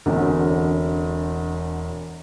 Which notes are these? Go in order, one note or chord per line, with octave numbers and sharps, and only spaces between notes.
E1 E2 D3 C4 C#4 F#4